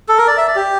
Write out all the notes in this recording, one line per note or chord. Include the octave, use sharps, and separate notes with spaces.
A4
A#4
D5
E5
D5
G4